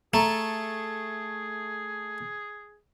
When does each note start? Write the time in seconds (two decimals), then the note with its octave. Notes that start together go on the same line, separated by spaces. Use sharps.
0.14 A3 G#4 A#5